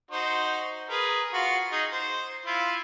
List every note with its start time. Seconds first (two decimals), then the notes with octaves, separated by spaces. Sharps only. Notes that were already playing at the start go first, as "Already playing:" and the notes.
0.11 D#4 F#4 C5
0.89 G#4 A#4 B4
1.33 F4 F#4
1.72 D#4 G#4
1.92 C5
2.46 E4 F4